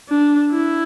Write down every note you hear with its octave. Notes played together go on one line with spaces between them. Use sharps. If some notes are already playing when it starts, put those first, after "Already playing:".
D4
E4